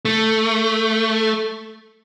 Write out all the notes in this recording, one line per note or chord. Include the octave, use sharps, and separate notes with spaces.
A3